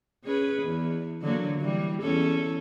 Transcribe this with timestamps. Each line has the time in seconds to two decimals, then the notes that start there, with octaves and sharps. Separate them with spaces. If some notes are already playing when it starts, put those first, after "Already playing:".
0.24 C#4 G#4 B4
0.63 E2
1.22 D3 F#3 A#3
1.61 E3 G3
2.03 E2 C#4 A4